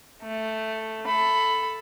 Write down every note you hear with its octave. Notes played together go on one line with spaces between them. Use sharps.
A3
A4 B5